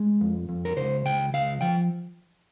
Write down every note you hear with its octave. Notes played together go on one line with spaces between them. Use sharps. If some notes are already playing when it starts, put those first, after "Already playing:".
Already playing: G#3
F2
F2
A#4
C#2 C5
C#2 G5
C#2 F5
F3 G5